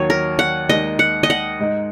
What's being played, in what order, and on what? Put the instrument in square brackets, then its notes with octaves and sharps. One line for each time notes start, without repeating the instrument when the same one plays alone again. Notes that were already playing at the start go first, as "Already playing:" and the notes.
Already playing: [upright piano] D#2 D#3 F#3 [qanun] C#5
[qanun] A#4
F#5
[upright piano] D#2 D#3 G#3 D#4 [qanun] D#5
[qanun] F#5
D#5
F#5
[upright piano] G#2 G#3 D#4